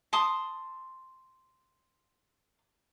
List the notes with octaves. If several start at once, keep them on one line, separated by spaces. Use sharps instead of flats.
A5 C6 D#6